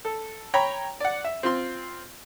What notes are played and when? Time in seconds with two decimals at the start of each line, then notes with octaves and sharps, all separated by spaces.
0.05 A4
0.54 C#5 G5 A#5 B5
1.00 D5 F#5
1.25 E5
1.43 C4 F4 C6